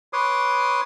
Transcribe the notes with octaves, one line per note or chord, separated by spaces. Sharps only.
B4 C#5 C6 D6 D#6